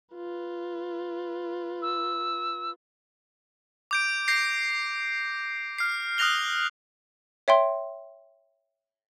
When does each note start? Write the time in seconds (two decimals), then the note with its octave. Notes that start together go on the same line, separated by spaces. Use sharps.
0.15 F4 B4
1.82 E6
3.91 D6 G6 D7
4.28 G6 A#6 C7
5.78 F6 C7
6.18 D#6 F6 F#6 A#6 F7 G7
7.48 C#5 E5 G5 C6